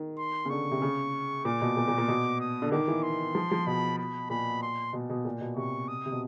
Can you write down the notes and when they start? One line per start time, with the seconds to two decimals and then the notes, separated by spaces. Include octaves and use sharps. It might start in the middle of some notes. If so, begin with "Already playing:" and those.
Already playing: D#3
0.18 C6
0.45 C#3
0.50 D3 C#6
0.71 C3
0.82 C#3
1.45 A#2 D6
1.61 B2
1.77 A#2
1.88 A#2
1.98 A#2
2.08 B2
2.40 D#6
2.62 D3
2.72 D#3 D6
2.88 E3
3.03 C6
3.35 F3
3.51 F3
3.67 B2 B5
3.98 B5
4.30 A#2 B5
4.62 C6
4.93 B2
5.10 B2
5.25 A#2
5.41 B2
5.56 C3 C#6
5.88 D#6
6.06 C3
6.12 B2